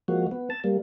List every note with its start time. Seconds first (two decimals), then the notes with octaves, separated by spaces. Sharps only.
0.08 F3 G#3 A#3 F#4
0.31 B3
0.50 A5
0.64 G3 A#3